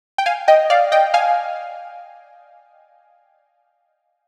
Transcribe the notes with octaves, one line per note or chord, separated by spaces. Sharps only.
G5
F5 G#5
D#5 G5
D5 F5
D#5 G5
F5 G#5